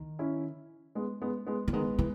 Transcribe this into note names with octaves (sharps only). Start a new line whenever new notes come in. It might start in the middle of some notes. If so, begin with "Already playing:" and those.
Already playing: D#3
C#4 E4
G#3 B3
G#3 B3
G#3 B3
E3
D#3 G#3 B3
E3